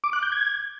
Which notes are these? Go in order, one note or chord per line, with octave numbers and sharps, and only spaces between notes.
D6
F#6
G6
G#6